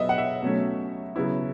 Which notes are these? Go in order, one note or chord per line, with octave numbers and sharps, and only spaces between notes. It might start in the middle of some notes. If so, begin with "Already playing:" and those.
Already playing: F#3 B3 D#5 E5
F#5
E5
B2 F#3 A3 C#4
C#3 F#3 B3 E4